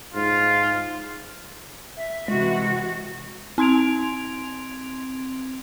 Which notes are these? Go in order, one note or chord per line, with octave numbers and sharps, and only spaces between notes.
G#2 F4
E5
C3 E3 G#3 F#4
C4 C6 G#6 D7 F7